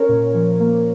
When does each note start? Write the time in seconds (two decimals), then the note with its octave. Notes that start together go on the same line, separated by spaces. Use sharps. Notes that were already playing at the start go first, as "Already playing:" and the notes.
Already playing: C#4 A#4 C#5
0.09 A#2
0.34 F3
0.60 A#3